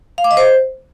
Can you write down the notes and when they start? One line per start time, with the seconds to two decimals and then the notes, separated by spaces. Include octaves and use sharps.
0.18 F5
0.24 D6
0.31 D#5
0.37 C5